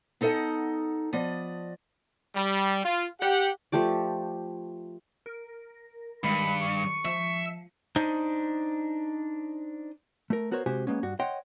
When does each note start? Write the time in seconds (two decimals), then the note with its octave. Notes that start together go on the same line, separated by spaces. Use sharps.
0.21 B3 D#4 A4 D#5 F#5
1.13 F3 B3 D5 D#5
2.36 G3
2.84 F4
3.20 G4 F#5
3.72 F3 A3 G4 D5
5.26 A#4
6.24 G2 D#3 G#3 B5 C#7 D#7
6.62 C#6
7.05 F3 E5
7.96 D4 D#4 C5 D#5
10.30 A3 A#4
10.51 B3 F#4 A#4 C5 C#5
10.66 C3 G#3 F#4 G4 C5 G#5
10.87 G#3 A#3 B3 C#4
11.03 G2 F#4
11.20 C#5 D#5 F#5 G5 C6